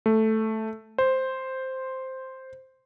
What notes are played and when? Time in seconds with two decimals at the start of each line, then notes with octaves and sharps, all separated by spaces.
0.06 A3
0.98 C5